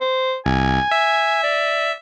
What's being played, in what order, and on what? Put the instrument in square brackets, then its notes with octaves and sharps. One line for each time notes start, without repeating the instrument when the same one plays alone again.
[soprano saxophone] C5
[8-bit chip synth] C2 [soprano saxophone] G#5
[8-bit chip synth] E5
[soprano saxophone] D5